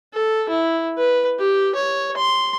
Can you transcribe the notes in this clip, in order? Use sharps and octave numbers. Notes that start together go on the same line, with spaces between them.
A4
E4
B4
G4
C#5
C6